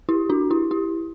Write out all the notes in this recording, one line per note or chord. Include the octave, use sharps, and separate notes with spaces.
E4 G4
D4 F#4
E4 G4
E4 G4